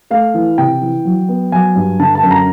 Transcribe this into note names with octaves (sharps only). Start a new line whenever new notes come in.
A3 F5
E3
C3 G5
E3
F#3
B3
F#3 G#5
G2
D3 A5
A5
F#2
A#5